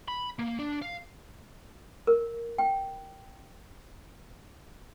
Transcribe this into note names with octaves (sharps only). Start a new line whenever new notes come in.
B5
A#3
D4
F5
A#4
G5